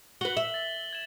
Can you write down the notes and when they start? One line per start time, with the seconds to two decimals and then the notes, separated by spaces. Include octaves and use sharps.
0.21 F#4 B4 F#7 G7
0.37 E5
0.54 A6 B6
0.93 G#6 E7 G7